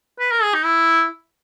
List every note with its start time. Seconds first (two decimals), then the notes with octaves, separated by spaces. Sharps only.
0.19 B4
0.31 A#4
0.43 G#4
0.54 D#4
0.65 E4